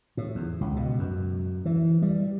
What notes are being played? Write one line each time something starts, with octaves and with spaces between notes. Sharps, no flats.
A2
E2
C#2
B2
F#2
E3
G3